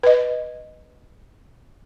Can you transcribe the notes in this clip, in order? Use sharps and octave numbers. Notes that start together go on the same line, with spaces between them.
B4 D#5